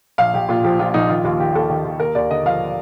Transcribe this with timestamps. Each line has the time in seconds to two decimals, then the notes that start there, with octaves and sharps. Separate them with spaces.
0.18 A#1 F5
0.34 A#1 G4
0.48 A#2 F4
0.64 F3 G4
0.79 A#1 F4
0.94 A#1 D#4
1.10 D#3 F4
1.24 D#2 F4
1.39 D#3 G4
1.55 D#2 A4
1.69 D#3
1.84 D#2
1.99 D#2 A#4
2.15 D#2 D5
2.30 D3 D#5
2.45 F3 F5